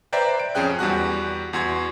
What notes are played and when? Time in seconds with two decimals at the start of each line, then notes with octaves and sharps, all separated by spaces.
0.13 B4 C5 D5 E5 G5 A#5
0.39 D7
0.55 F2 C#4 G#4 G5 F#6
0.79 E2 G3 F#4 F#6
1.53 E2 F#4 C6 G#6